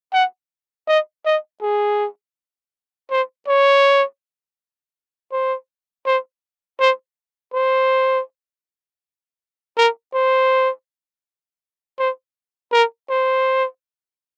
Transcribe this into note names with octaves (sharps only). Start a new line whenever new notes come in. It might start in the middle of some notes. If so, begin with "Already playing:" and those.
F#5
D#5
D#5
G#4
C5
C#5
C5
C5
C5
C5
A#4
C5
C5
A#4
C5